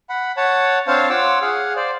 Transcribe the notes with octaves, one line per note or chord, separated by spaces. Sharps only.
F#5 B5
C#5 F#5 A5
C4 D4 C5 C#5 F5 A5
F4 C#5 F#5 D6 E6
G#4 F5 F#5
C5 D5